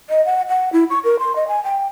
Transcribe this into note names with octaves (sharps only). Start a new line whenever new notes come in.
D#5
F#5
F#5
E4
C#6
A#4
C6
D#5
G#5
G5